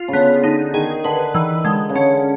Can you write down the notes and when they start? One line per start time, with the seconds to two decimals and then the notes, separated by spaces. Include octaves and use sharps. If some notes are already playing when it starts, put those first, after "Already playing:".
Already playing: F4
0.08 C#3
0.13 D3 B3
0.43 D3 D#4
0.74 D#3 G#4
1.04 D3 B4
1.34 D#3 E3
1.65 D3 G#3
1.89 C#3
1.95 D3 C#4